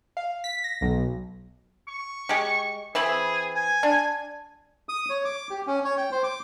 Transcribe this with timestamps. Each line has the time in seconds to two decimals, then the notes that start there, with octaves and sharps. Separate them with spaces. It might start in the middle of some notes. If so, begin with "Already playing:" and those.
0.17 F5
0.44 B6
0.64 A#6
0.81 B1
1.88 C#6
2.29 G#3 G4
2.95 E3 C4 G#4 B5
3.55 G#5
3.83 D4
4.89 D#6
5.10 C#5
5.25 D6
5.50 G4
5.67 C#4
5.84 C#5
5.97 G5
6.12 C5
6.23 D6